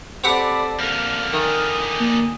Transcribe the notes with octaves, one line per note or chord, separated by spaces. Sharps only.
C4 G4 A4 D5 F#5 B5
F2 D3 A#3 F6
D#3 G#5 D#6
A#3